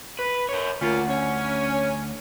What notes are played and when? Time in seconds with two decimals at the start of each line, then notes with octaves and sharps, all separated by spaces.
0.19 B4
0.49 A#4 C#5
0.81 D2 A#3 C#4 F4
1.08 C#4